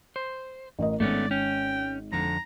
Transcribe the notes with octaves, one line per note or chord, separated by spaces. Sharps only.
C5
A1 A#4 D#5
G#1 A3 B3 C#4 D5
C#4 G5
F2 D3 A#5